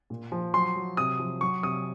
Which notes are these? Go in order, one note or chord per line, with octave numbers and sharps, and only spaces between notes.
A#2
F3
F#3 C6
F#3
C3 D#6
F3
F#3 C#6
C3 D#6